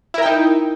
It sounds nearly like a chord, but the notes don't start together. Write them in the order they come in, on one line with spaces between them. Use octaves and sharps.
E4 A#4 G5 D#4